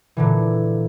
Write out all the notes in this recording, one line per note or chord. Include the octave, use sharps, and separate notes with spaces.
A#2 D3 E3